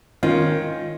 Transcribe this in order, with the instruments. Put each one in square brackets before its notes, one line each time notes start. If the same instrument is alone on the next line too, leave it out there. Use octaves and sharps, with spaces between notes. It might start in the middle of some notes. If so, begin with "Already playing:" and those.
[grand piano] D#3 [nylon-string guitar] C#4 F4